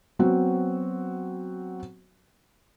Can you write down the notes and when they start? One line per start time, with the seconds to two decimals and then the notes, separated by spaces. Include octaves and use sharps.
0.19 F#3 B3 C4 F#4